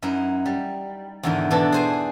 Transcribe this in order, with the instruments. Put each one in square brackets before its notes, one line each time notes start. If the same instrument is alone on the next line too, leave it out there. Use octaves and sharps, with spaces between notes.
[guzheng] F#2 D#4 E4
G3
E2 G#2 D3 D#3 E4
B2 E3 D4 A4
G#4 C5 G#5